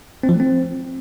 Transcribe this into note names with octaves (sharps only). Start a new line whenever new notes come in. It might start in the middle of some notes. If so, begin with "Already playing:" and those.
C4
F3
A3
C4